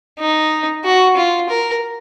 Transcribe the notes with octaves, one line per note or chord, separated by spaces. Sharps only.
D#4
F#4
F4
A#4